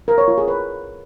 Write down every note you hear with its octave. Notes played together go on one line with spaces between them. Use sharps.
A#4
C#5
F4
G#4
B4